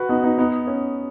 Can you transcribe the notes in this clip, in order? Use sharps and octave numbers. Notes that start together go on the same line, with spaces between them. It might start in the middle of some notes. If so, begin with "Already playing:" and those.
Already playing: F#4 B4
B3 D#4
B3 D#4
B3 D#4
C#4